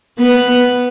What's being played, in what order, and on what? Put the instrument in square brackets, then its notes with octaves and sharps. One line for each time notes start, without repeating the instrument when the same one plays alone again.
[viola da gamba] B3